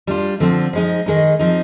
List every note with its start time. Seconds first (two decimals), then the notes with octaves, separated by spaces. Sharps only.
0.07 G3 D4 F4
0.40 D3 F3 C4 F4
0.73 F3 G#3 D#4
1.06 D#3 G#3 D#4
1.39 F3 C4 D#4